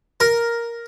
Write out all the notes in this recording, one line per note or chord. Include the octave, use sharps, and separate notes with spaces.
A#4